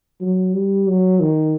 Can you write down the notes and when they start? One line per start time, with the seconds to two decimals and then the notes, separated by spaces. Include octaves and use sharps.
0.21 F#3
0.55 G3
0.87 F#3
1.20 D#3